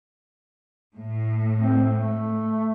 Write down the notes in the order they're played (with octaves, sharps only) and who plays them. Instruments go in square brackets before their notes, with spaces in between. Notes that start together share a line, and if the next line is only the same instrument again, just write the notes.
[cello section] A2
[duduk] C4
A3